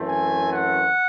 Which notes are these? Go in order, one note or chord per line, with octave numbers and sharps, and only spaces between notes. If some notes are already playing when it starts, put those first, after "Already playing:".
Already playing: F#2 E3 A3 C4
G#5
F#5